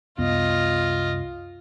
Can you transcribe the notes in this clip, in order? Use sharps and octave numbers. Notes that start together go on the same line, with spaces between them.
C2 F#2 B3 F4 D#5